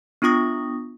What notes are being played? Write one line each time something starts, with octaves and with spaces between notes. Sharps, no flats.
B3 D4 F4 C#6 D#6 A#6